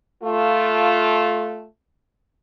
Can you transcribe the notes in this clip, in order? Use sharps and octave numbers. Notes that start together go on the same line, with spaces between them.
A3 F4